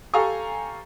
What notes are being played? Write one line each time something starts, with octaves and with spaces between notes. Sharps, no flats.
G4 A4 F5 G#5 A#5 C#6